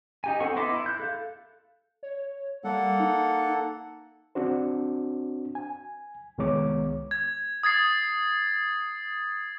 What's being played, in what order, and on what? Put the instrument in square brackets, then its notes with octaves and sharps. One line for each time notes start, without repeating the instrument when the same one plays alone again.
[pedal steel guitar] D#4 G4 G#5
C4 A4 F#5 C#6
B3 D#4 E4 C6 D6
E4
F#6 G6
A4 F5
[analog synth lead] C#5
[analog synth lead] G3 [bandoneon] A#3 A4 F#5
[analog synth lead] D#4
[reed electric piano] C4 D4 F#4 C5
G#5
C2 D#3 G#3 B3 C#5 D6
[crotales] G#6
D#6 G#6 A6 C7